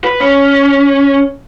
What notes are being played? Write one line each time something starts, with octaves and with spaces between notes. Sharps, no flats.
B4
C#4